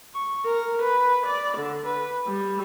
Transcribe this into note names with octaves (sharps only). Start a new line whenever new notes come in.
C#6
A#4
B4
D5
D3
B4
G3